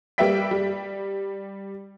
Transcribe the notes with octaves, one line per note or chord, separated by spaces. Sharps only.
G3 A#3 B4 E5 G5 B6
G3